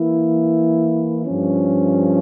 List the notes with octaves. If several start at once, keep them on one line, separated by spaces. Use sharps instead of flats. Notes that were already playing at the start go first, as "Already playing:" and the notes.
Already playing: E3 A#3 E4
G2 F3 C#4